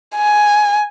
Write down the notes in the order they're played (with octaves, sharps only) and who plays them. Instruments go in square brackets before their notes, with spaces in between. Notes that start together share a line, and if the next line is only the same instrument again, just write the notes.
[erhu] G#5